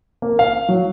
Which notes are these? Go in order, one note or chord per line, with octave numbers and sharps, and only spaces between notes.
A#3
F5
F#3